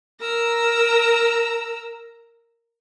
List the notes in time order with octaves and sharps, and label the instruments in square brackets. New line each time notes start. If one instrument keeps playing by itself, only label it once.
[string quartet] A#4 A#5 E6